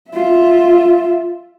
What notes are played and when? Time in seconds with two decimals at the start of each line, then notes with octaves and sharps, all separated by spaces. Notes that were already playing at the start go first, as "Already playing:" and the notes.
0.11 F4 E5